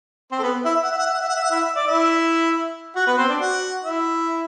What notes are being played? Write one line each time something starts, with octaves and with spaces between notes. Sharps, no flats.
C4 C5
A4
B3 B4
E4 E5
E5
F#5
E5
F#5
E5
F#5
E5
F#5
E5
F#5
E4 E5
E5
D5
E4 E5
F#4 F#5
B3 B4
C4 C5
D4 D5
F#4 F#5
E4 E5